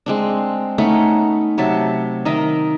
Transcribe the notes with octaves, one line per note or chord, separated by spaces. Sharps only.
G#3 C4 D4
A3 B3 C#4 D#4
C3 F#3 E5 A5
D#3 A#4 D#5 E5